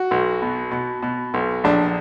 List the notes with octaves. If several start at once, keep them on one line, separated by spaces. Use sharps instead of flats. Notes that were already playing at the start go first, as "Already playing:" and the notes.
Already playing: F#4
B1
B2
B2
B2
B1
A#1 D4